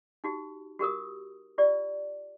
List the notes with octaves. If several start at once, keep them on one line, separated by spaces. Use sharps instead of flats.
D#4 F#4 G4
F#4 G4 A#4 D#6
F4 G4 D5